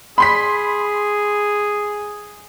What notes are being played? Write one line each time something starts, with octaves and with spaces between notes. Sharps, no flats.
G#4 B5 C6 B6